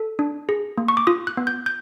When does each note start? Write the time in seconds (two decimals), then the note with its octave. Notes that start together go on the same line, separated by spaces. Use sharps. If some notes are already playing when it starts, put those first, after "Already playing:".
Already playing: A4
0.19 D4
0.49 G#4
0.78 A#3
0.88 C#6
0.97 D6
1.07 F4 D#6
1.27 F#6
1.37 B3
1.47 G6
1.66 G6